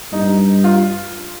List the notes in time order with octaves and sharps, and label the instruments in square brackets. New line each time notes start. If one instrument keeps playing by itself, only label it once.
[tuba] G2 [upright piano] D#4
[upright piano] F4